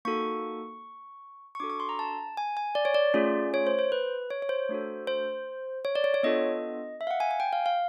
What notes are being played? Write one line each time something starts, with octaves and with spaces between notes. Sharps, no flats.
A#3 D#4 F#4 A4 C#6
C#6
D4 F#4 A4 D6
C#6
C6
A#5
A5
G#5
G#5
D5
C#5
D5
A3 C#4 F4 G#4
C#5
C5
C5
B4
C#5
C#5
C5
A3 D4 F#4 A4
C5
C#5
D5
C#5
C#5
B3 D4 F4 A4 D#5
E5
F5
F#5
G#5
G#5
G5
F5
F5